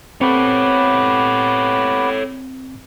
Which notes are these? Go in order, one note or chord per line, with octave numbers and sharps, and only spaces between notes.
B3 C4 G4 A4 B4 C#5